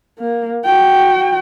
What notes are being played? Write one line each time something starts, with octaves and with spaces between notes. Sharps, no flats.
A#3
F#4 G5